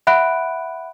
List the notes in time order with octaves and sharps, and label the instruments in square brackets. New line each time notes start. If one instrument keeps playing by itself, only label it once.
[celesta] E5 F#5 B5 F#6 D7